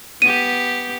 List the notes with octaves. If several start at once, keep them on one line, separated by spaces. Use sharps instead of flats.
B3 G4 D#7